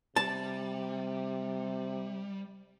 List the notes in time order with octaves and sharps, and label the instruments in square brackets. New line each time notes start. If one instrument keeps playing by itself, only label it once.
[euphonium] C3 [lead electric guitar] G3 [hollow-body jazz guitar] A5